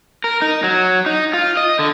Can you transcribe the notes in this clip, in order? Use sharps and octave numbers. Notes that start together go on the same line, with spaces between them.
A#4
D#4
F#3
D#4
F4
D#5
D3